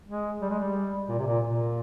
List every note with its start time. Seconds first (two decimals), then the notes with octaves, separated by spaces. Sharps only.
0.07 G#3
0.42 G3
0.50 G#3
0.59 G3
1.09 A#2
1.19 C3
1.27 A#2
1.43 A#2